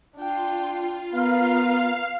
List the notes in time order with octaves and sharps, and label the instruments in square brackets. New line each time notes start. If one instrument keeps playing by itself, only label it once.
[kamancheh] D4 G5 [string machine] F4 C6
[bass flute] B3 [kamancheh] A#4 B4 [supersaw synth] F5